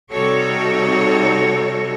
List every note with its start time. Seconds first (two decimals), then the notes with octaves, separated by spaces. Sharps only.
0.11 C3 G3 D#4 F#4 A4 C#5